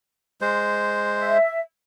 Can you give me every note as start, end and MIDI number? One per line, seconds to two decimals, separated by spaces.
0.41 1.37 56
0.41 1.37 72
1.18 1.59 76